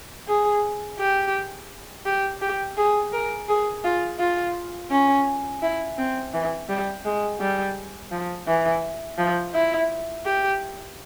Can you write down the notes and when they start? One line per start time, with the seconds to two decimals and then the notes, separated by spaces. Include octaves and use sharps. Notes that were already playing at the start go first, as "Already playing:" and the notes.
0.28 G#4
0.99 G4
2.06 G4
2.42 G4
2.77 G#4
3.13 A#4
3.48 G#4
3.84 F4
4.19 F4
4.91 C#4
5.62 E4
5.98 C4
6.34 E3
6.69 G3
7.05 G#3
7.40 G3
8.11 F3
8.47 E3
9.18 F3
9.54 E4
10.25 G4